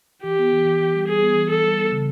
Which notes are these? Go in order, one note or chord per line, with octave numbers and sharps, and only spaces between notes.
E3 G4
B3
E3
E3
E3
G3
G3 G#4
B3
E3
E3 A4
G3
B3
C#3